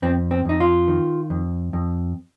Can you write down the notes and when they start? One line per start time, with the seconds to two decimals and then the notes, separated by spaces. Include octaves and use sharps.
0.02 F2 C4
0.31 C4
0.45 F2 D#4
0.60 F4
0.88 D#3
1.30 F2
1.73 F2